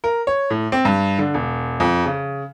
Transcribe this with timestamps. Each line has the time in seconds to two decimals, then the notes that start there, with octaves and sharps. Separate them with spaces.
0.04 A#4
0.27 C#5
0.50 A2
0.72 C4
0.85 G2
1.19 D3
1.34 E1
1.80 F2
2.06 C#3